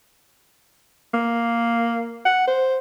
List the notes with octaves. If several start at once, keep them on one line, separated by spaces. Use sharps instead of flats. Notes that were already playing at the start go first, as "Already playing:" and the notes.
A#3
F#5
C5